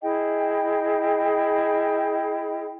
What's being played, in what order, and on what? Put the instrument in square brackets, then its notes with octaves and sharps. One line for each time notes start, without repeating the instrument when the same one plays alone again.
[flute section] E4 G#4 D#5 G5